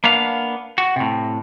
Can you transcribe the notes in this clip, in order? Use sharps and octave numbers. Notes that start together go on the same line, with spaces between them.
A#3 B3 D4 F5
F#4
A2 C3